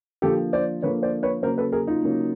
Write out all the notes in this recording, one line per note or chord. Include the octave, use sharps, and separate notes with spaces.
D3 F3 A#3 G4 A4
C5 D5
D3 F3 A#3 B4 C#5
C5 D5
B4 C#5
C#3 F#3 A#3 A#4 C5
A4 B4
G#4 A#4
D#4 F4
C#3 F#3 A#3